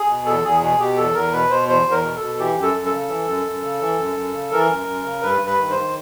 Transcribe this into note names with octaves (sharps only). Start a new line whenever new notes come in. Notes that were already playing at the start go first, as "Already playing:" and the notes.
Already playing: G#4
B2
E2 A4
E2 G#4
B2 G#4
B2 G4
E2 A4
E2 A#4
B2 B4
B2 C5
E2 C5
E2
A#4
B2
A4
B2
E3 G4
F#2
A4
F#2
A4
C#3
E3
F#2
F#2
C#3
E3
F#2
F#2
C#3
E3 A#4
F#2
F#2
C#3
G2 B4
G2
B4
D#3
C5
D#3